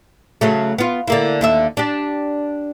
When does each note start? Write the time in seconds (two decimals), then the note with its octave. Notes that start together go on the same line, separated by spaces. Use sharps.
0.41 C#3 F#3 A3
0.78 B3 F4
1.08 D3 A#3 E4
1.41 D#2 D3 E5
1.77 D4 G4